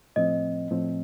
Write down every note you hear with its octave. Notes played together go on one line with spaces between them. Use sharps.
A2 F3 C4 D#5
A2 F3 C4